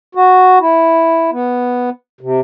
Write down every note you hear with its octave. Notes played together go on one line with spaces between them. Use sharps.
F#4
E4
B3
C3